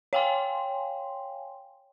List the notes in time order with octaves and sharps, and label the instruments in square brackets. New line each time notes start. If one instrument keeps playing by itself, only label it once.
[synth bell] C#5 F5 G5 G#5 C6